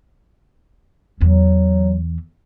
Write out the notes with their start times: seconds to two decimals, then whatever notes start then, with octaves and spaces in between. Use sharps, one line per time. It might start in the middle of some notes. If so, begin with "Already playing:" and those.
1.21 E2 E3 F#3